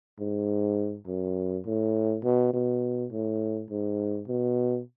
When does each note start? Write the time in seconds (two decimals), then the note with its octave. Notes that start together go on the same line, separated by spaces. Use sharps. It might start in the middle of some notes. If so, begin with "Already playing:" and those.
0.19 G#2
1.07 F#2
1.66 A2
2.24 B2
2.53 B2
3.12 A2
3.70 G#2
4.28 B2